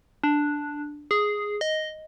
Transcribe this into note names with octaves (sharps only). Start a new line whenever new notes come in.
D4
G#4
D#5